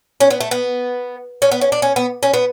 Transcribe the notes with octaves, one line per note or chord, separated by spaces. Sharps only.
C#4
B3
A3
B3
C#4
B3
C#4
D4
C#4
B3
C#4
B3